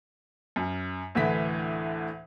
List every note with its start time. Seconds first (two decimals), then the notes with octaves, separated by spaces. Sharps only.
0.56 F#2
1.15 D2 A2 D3 E3 B6